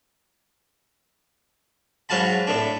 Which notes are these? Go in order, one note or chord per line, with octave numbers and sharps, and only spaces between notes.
G#2 F#3 F#4 F5 A5 B5
A2 A3 D4